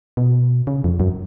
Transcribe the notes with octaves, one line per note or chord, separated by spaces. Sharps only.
B2
C#3
F2
F#2